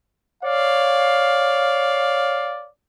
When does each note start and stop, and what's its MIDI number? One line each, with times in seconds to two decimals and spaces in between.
0.43 2.68 73
0.43 2.68 74
0.43 2.68 77